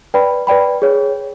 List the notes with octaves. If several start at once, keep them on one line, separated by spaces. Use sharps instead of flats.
B4 D5 G5 B5
B4 D5 G5 B5
G#4 C#5